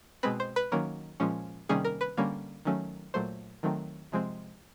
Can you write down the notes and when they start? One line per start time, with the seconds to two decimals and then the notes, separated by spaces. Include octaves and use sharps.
0.23 B2 G#3 C4 B4
0.40 C5
0.56 B4
0.72 D#3 F#3 A#3 C#4 A#4
1.20 A#2 F3 G#3 C#4
1.69 C3 D#3 G3 A#3 C#4 G#4
1.84 A#4
2.01 B4
2.17 D3 G3 A#3 C#4
2.65 D#3 F#3 A3 C#4
3.14 A#2 F#3 A3 C5
3.63 D#3 F#3 A3 C4
4.12 C3 F3 G#3 C4